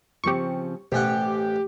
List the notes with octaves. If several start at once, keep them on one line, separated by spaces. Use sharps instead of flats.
C#3 F3 C4 G4 C#6
A1 B2 C#4 G4 C5 F#5